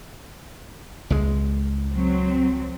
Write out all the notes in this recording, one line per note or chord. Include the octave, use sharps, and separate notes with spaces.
C#2 G#3
F#3 C4